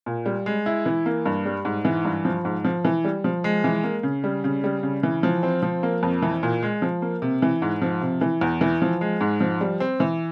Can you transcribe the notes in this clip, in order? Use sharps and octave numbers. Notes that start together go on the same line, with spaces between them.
A#2
G3
G#3
E4
E3
A#3
G2
G3
G#2
E3
G2
F3
G#2
F3
E3
G3
F3
G#3
E3
A#3
C#3
G3
C#3
G3
C#3
E3
F3
C4
F3
A#3
F2
E3
A#2
G#3
F3
A#3
C3
E3
G#2
F3
C3
E3
E2
E3
F3
G#3
G#2
F3
G3
C4
E3